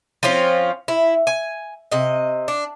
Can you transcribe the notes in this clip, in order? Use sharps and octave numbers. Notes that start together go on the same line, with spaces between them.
F3 C4 C#4 F4
E4
G#5
C3 D#5
D4